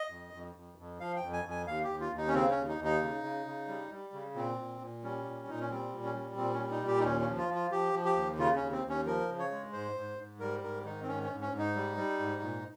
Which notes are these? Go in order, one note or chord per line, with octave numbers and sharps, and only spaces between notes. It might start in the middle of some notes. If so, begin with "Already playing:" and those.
Already playing: D#5
F2
F2
F2
F2
F3 F5
G5
F2
G#5
F2
G#5
D#2 F5
G4
D#2
F4
D#2
D#4
C#4
C#3 C4
C#4
D#2
D#4
D#2
D#4
C#3
C#3
C#3
G3
G3
C#3
A#2 C4
A#2
A#2
G3 C#4
A#2
A#2 D#4
C#4
G3 C4
A#2
C#4
G3
A#2 C4
C#4
G3
D#4
A#2 G4
D#4
D#2 C#4
C#4
F3
F4
F3
F4
F3 G4
F3
G4
D#2
C#3 F4
D#2 C#4
C4
D#2
C#4
F3 A#4
C#3
C#5
G#3
G#2 C5
G#2
G#2
G3 A#4
G#2 A#4
D#3 D#4
C4
G#2 C#4
C#4
G#2
C#4
G#2
D#4
G3
G3
G#2
A#2